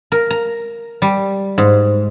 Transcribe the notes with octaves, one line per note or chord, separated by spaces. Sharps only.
A#4
A#5
G3
G#2